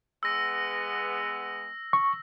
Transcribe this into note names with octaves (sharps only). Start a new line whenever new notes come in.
G#3 B3 E6 A#6
C#6